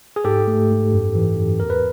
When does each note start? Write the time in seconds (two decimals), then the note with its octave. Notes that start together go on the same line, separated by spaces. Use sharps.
0.16 G#4
0.24 G#2 G4 A4
0.47 A3
0.70 G#2
0.93 F#2
1.15 E3
1.37 F#2
1.60 E2 A#4
1.70 B4